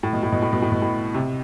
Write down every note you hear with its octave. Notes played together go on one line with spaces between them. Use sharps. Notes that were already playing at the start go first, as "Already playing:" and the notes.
A2
B2
A2
B2
A2
B2
A2
B2
A2
C3